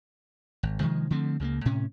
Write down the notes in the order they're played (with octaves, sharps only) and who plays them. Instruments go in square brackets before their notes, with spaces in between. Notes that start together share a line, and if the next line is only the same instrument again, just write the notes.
[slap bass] G#1
C3 D#3 F3 G#3
D3 F3 A3 C4
C#2 C#3 A3 A#3
A2 C3 C#4